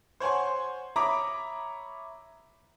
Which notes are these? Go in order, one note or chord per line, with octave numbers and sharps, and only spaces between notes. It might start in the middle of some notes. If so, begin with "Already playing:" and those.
C5 C#5 F#5 G#5 C6
C#5 E5 A#5 B5 D6 D#6